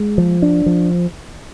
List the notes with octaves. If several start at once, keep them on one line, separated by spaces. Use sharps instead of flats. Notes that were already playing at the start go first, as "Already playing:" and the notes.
Already playing: G#3
F3
D4
F3